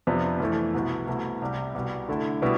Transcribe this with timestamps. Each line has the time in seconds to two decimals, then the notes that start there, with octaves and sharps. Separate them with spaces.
0.07 F2 C3 F3 B3 D4
0.40 F2 E3 A3 E4
0.74 C2 B2 B3 E4
1.07 C2 B2 A3 E4
1.42 C2 C3 G3
1.74 C2 B2 G3
2.08 D3 A3 E4
2.42 B2 G3 B3 E4